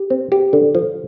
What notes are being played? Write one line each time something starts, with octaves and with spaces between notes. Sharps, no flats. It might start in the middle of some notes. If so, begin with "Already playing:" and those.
Already playing: G4
C4
G4
D3
F3